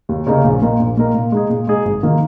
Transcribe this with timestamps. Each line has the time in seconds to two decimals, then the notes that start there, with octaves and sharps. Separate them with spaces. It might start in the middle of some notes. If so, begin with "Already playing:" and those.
0.09 D#2
0.27 C#3 A#3 D#4 C#5
0.44 A#1
0.62 A#2 A#3 D#4 A#4
0.80 A#1
0.97 A#2 A#3 D#4 A#4
1.15 A#2
1.32 G#3 D#4 G#4
1.50 A#2
1.67 G#3 D#4 G#4
1.85 G#1
2.03 D#3 A#3 F4